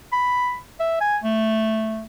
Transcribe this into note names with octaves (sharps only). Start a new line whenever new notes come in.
B5
E5
G#5
A3